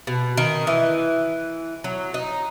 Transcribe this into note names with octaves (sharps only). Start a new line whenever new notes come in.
B2
D#3
E3
F#3
D#4